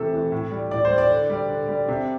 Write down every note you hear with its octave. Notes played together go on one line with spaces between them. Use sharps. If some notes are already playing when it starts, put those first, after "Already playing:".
Already playing: C3 E3 A3 A4
E3 A3
A2
G3
A2 D5
C5
G3
D5
D3
G3
D3
G3
C3